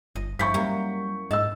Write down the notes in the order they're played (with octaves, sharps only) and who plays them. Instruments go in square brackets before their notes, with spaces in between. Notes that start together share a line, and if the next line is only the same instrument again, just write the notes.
[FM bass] G1 [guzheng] D#5
[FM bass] G2 [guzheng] F3 E4 [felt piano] C#6 G6 B6
[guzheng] F#2 A#3 [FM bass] G3
[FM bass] G#2 [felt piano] D#5 E6 [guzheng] A5